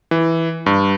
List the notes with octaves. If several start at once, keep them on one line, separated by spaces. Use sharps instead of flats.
E3
G2